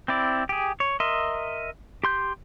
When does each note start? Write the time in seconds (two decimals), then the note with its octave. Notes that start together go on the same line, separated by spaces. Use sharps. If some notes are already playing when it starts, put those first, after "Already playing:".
0.08 C4 E4 D5
0.49 G4 G#4
0.80 C#5
1.00 A#4 D#5 E5 C6
2.04 G4 C6 G6